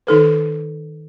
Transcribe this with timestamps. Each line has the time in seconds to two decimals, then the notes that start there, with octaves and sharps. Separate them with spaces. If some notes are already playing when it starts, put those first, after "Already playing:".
0.07 D#3 D#4 A4 B4